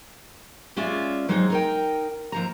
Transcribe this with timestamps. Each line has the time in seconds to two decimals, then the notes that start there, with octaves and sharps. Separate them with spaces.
0.76 G#3 C#4 F4 D5 E5
1.29 F#3 G#3 C4 D#4
1.50 D#4 A#4 G5
2.32 D#2 F3 A#5